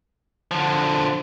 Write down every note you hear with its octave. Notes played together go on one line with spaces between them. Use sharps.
D3 F3